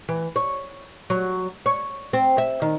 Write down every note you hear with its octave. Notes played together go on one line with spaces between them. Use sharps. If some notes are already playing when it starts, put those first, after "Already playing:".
E3
C#5
F#3
C#5
C4
E5
D#3